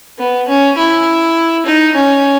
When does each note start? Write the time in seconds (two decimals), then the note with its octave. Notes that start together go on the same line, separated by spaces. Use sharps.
0.19 B3
0.48 C#4
0.78 E4
1.66 D#4
1.95 C#4